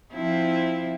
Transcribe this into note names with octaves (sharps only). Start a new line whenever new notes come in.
F3 C4 E4